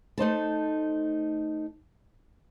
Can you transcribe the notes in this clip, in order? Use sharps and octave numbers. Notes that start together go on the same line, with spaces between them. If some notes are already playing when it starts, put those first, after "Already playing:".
A3 D#4 C5 A5